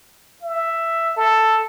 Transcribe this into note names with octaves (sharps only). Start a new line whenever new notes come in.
E5
A4